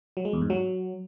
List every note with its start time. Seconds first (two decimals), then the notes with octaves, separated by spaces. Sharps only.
0.17 F#3
0.25 G#3
0.33 E2
0.42 G#2
0.50 F#3